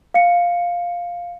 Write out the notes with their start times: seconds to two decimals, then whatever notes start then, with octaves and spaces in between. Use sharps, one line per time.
0.14 F5 C#7